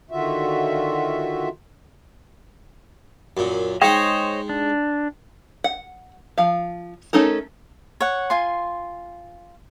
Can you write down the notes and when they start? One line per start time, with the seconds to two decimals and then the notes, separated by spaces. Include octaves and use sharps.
0.11 D3 D#3 F4 F#4 E5
3.37 F#2 A#2
3.82 G#3 D#4 C5 C#5 D#5 G5
4.49 D4
5.64 F#5
6.38 F3 F5
7.13 A3 C#4 D#4 A4 A#4
8.01 C#5 F#5
8.30 F4 G#5 C6